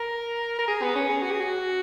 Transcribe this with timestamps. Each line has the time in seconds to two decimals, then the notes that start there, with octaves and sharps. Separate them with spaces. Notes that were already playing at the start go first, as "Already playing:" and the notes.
Already playing: A#4
0.59 A#4
0.68 G#4
0.82 B3
0.95 C#4
1.09 G#4
1.22 F#4
1.31 G#4
1.40 F#4